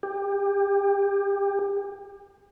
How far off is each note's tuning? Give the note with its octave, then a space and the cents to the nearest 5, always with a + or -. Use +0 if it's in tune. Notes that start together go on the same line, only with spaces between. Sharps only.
G4 +30